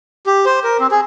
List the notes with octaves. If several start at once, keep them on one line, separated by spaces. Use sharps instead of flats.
G4
C5
A#4
C4
G#4